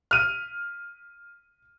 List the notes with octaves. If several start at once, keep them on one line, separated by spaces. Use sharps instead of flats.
F6 D#7